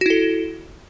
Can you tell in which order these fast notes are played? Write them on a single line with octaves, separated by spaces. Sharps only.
F#4 E4 A4